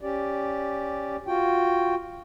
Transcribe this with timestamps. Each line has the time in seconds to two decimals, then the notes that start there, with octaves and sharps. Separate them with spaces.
0.01 C#4 G4 D5
1.27 F4 F#4 G5